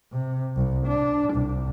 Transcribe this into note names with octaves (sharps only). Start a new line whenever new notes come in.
C3
C2
D4
C2